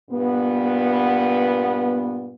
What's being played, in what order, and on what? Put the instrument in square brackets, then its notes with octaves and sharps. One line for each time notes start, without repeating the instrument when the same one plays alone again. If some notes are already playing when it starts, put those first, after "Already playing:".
[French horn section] G2 A#2 B3